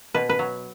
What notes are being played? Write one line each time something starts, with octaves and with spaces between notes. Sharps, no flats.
B2 B4
B4
F#3